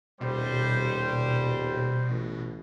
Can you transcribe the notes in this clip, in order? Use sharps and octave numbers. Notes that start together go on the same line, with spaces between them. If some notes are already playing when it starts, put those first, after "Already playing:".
D#1 B2 G3 C5
A1